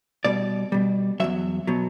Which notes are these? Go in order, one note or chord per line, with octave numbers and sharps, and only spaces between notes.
B2 G3 D5
B2 G3
E2 B2 F#3 E5
B2 F#3